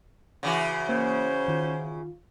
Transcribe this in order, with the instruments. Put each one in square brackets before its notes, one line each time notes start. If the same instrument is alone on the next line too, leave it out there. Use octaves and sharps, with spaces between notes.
[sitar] C#3 E3 F#4
[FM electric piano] A#3 [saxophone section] C#4 C5
[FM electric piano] D#3 F4